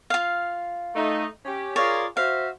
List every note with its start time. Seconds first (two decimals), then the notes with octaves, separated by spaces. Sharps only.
0.10 F4 F5
0.95 A3 D#4
1.45 C#4 G4
1.76 F4 G#4 A#4 C#5 D5
2.17 F#4 C5 E5 F5